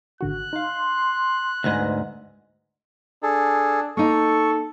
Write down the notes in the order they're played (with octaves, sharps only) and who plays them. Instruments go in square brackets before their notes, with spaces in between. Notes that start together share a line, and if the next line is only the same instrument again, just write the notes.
[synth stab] G#1 D3 F#4 [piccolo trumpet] F#6
[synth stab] D#4 F5 [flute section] C6
[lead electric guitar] D2 G#2 [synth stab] B4 G#5 A#6
[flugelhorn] D4 [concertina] G#4 A4
[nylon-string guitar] A#3 D#4 [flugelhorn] A4 [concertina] C#6